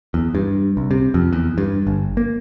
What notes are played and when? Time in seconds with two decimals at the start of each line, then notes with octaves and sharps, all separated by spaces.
0.14 E2
0.35 G2
0.77 C2
0.91 C3
1.14 F2
1.33 E2
1.58 G2
1.87 G1
2.17 A#3